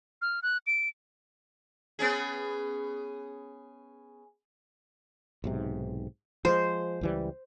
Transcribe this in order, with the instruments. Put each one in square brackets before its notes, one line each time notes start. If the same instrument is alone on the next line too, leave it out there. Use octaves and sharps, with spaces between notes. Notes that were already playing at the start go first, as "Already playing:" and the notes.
[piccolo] F6
F#6
D7
[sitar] B3 C#4 G#4
[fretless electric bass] B1 G#2 C3
[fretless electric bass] F3 G#3 [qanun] C5
[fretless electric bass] C#2 E3 G3